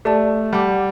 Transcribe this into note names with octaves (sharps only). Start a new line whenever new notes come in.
A3 G4 D5 A5
G3 F#5 A5 D6